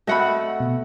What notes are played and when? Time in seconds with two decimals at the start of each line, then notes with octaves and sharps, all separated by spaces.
0.07 A3 C4 F#4 D#5 F#5 B5
0.60 B2